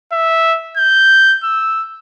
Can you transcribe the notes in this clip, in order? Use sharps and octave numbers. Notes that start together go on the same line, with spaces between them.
E5
G6
E6